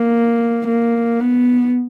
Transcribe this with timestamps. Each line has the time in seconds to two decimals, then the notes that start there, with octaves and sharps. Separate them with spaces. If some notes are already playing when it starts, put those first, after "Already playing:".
Already playing: A#3
0.67 A#3
1.20 B3